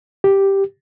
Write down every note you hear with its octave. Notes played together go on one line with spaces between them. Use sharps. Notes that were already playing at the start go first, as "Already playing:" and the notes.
G4